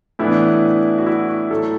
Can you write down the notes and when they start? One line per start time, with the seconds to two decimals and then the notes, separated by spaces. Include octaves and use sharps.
0.19 A2 E3 B3 D4 E4
0.98 F#4
1.06 E4
1.29 F#4
1.51 A2 F#3 A3 A4